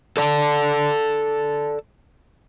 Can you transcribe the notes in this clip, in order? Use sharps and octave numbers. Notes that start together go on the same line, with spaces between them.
A4 D5 A5